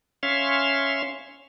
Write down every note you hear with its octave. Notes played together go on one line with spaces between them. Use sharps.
C#4 C#5 E5 F5 C6